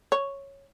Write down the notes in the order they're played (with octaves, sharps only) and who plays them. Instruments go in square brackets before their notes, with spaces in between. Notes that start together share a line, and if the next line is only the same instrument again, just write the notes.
[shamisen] C#5